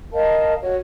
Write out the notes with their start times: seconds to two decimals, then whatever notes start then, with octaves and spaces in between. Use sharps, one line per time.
0.13 A#4 D#5 F5 A5
0.62 F#4 C#5